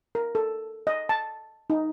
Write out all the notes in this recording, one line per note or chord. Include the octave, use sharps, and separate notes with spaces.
A#4
A4
D#5
A5
D#4